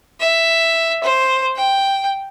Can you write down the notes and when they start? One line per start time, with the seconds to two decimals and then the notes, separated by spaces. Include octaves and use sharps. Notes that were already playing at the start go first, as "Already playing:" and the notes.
0.20 E5
1.04 C5
1.56 G5